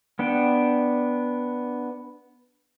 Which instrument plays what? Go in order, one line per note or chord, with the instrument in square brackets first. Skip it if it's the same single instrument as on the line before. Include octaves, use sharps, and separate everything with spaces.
[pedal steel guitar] B3 D4 G5